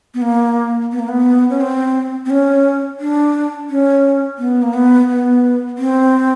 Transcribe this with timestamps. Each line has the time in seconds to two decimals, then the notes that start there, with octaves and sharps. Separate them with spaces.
0.14 B3
0.22 A#3
0.92 B3
0.99 A#3
1.08 B3
1.50 C#4
1.61 C4
2.25 C4
2.30 C#4
3.00 D4
3.69 C#4
4.38 B3
4.62 A#3
4.74 B3
5.09 B3
5.78 C4